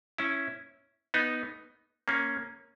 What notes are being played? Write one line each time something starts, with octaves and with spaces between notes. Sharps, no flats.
C#4 E4
B3 D#4
A#3 C#4